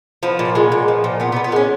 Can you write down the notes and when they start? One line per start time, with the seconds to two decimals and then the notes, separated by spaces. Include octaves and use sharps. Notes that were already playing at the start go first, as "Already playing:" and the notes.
0.23 F3 B3
0.39 A#2
0.55 G#3
0.72 A#2
0.88 F3
1.04 A#2
1.20 F3 B3
1.32 B3
1.36 A#2
1.44 B3
1.52 G#3 C#4